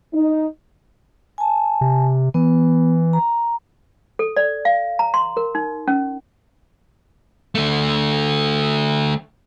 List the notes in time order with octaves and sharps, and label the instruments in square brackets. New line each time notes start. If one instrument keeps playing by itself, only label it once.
[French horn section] D#4
[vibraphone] G#5 A5
[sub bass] C3
[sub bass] E3 [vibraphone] B3
[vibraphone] A#5
[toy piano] A4
D5
F5
A#5
C6
A#4
D#4
C#4
[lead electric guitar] D3 A3